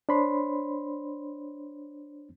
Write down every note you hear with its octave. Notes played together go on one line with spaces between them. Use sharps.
D4 C5 C#5 B5 C6